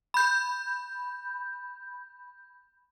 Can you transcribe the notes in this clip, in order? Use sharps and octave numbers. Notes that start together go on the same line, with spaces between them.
B5 G6